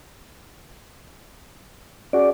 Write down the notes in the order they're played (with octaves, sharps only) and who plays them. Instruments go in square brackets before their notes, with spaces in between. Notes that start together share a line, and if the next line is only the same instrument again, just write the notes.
[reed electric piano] C#4 F#4 G#4 [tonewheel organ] D5